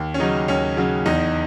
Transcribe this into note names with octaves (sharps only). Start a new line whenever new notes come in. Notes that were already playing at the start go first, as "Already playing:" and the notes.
Already playing: D#2
C#4
C#3 F#3 D#4
D#2 C#4
C#3 F#3
E2 D#4